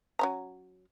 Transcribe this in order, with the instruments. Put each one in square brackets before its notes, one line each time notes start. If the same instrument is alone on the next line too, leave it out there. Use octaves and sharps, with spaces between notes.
[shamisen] F#3 C#4 A#5